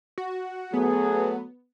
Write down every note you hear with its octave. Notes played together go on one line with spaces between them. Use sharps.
F#4
F#3 A3 B3 G#4